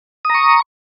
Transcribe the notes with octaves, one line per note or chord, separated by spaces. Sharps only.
A#5 C#6 D#6